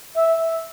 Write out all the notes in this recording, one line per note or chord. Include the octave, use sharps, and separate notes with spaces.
E5